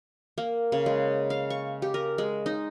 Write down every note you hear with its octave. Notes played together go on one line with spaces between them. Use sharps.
A#3
C#3
G#3
F5
C#6
G4
A#4
G#3
D#4